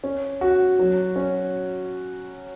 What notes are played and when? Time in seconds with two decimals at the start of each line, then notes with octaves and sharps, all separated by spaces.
0.04 C#4
0.41 F#4
0.79 F#3
1.16 C#4